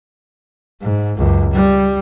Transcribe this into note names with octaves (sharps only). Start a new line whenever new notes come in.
G#2
C#2 F#2
G3